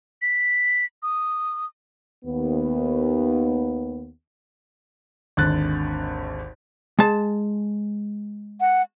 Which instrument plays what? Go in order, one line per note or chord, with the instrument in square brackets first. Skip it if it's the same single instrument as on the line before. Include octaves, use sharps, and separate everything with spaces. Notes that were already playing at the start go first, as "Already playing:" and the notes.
[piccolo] B6
D#6
[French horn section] D#2 B3
[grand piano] G#1 D#2 D3 F#6 A6
[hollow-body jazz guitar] G#3 A5
[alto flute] F#5